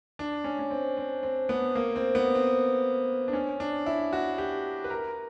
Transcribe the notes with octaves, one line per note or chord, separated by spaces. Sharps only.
D4
C#4
C#4
C4
C4
C4
B3
A#3
C4
B3
C4
D4
C#4
D4
E4
F#4
G4
B4
A#4